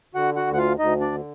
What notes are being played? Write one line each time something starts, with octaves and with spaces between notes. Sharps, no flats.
D3 F#4 F#5
F#4 F#5
D2
F#5
F4 F5
D2 D#4 D#5
D4 D5
D3